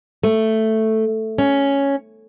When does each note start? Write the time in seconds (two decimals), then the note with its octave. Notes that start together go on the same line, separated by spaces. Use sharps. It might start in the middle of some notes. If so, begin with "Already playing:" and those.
0.23 A3
1.38 C#4